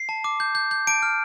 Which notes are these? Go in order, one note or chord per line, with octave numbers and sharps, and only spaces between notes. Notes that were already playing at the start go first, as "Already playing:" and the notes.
Already playing: C7
A5
D6
G6
G6
G6
A5 D7
F6